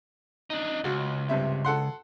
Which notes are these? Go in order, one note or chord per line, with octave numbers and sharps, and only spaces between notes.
D4 D#4
C#2 F#4
G2 C3 E5
A4 F#5 C6